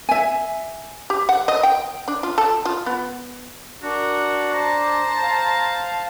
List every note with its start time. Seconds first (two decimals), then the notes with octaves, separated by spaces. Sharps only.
0.09 E5 G#5
1.10 G4
1.29 F#5
1.48 D#5
1.63 G5
2.08 D4
2.23 F4
2.38 A4
2.65 F4
2.86 B3
3.83 D4 F#4 A#4
4.53 C5 A5 A#5
5.23 F5